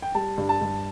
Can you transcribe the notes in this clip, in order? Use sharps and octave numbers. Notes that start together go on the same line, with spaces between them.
G5
G3 A5
G2
A5
G2